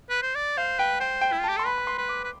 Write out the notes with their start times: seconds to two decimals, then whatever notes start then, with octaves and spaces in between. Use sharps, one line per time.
0.10 B4
0.22 C5
0.35 D5
0.57 C5 F5
0.79 B4 G5
1.00 C5 G5
1.21 G5
1.32 E4
1.40 F4
1.44 G4 A5
1.57 A4 C6
1.66 B4 B5
1.78 B5
1.87 C6
1.98 B4
2.09 D6
2.24 B4